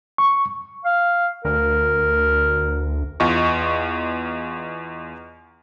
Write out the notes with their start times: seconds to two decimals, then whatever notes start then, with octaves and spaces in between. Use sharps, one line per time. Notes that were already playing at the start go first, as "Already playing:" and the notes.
0.18 C#6
0.85 F5
1.45 D2 A#4
3.20 E2 F4 D#5 C#6